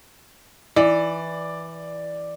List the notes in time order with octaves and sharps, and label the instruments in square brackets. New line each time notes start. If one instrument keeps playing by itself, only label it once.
[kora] E3 [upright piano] D5